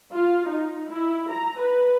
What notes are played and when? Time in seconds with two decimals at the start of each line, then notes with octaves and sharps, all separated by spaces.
0.13 F4
0.49 D#4
0.90 E4
1.31 A#5
1.60 B4